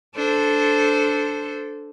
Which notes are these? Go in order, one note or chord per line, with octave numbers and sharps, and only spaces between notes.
D4 A4 C5